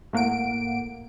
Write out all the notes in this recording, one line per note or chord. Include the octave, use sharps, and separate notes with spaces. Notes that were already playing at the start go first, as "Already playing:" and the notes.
A2 A#3 F#5 D7